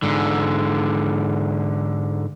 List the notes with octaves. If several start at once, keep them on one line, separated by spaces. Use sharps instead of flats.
G#2 D3